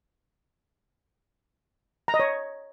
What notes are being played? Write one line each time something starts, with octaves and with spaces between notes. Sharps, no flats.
A#5
D#5
C#5